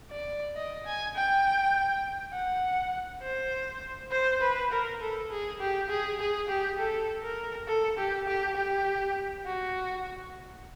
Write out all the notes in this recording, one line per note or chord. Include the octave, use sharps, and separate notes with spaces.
D5
D#5
G#5
G5
F#5
C5
C5
B4
A#4
A4
G#4
G4
G#4
G#4
G4
A4
A#4
A4
G4
G4
G4
F#4